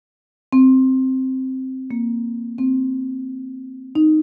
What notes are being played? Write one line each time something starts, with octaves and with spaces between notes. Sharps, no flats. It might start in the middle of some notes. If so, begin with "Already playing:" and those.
C4
A#3
C4
D#4